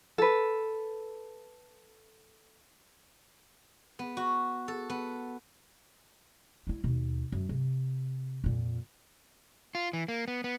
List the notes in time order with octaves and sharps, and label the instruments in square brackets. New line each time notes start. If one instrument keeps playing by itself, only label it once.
[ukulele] A4 B4
[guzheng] B3
F#4
A4
B3
[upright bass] G3 E4
D#2 B2
F#2
C3
F2 A#2
[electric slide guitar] F4
E3
A#3
B3
B3